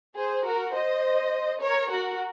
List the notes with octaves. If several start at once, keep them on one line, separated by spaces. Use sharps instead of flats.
G#4 C5
F#4 A#4
C5 D#5
A#4 C#5
F#4 A#4